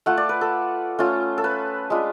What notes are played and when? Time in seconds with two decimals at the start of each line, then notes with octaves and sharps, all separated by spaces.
0.06 A3 F4 F#5
0.17 D5
0.29 B4
0.41 A4
0.99 A3 C#4 F4
1.38 A4
1.44 B4
1.90 G#3 D4 F4